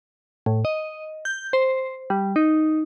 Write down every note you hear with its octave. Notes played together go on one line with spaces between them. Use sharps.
A2
D#5
G6
C5
G3
D#4